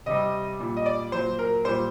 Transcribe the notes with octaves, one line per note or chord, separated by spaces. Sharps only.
C3 G3 D#5
A#2 G3
D#5
D5
A#2 F#3 C5
A#4
A#2 G3 C5